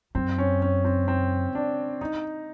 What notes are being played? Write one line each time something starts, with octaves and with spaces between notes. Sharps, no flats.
F#2 C4
C#4
C#4
C4
C4
D4
D#4